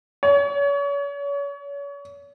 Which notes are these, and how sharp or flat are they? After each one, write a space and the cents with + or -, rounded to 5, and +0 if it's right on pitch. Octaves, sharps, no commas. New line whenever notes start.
C#5 +35